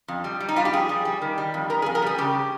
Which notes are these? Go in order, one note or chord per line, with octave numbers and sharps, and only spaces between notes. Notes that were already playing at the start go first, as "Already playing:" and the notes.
F2
G3
G3
D#4
G3 F4
G4
F2 G#4
G3
G3
D#3
G3
F2
F2 A#4
G#4
F2
A#4
G3 G#4
C#3 G4